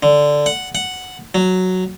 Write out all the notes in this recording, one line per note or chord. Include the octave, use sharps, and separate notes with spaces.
D3
F#5
F#5
F#3